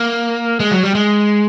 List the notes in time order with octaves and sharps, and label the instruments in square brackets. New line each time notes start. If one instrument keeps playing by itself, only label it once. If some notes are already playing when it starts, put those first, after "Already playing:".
Already playing: [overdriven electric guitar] A#3
G#3
F#3
G3
G#3